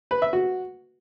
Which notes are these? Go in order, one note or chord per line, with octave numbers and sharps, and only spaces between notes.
B4
E5
F#4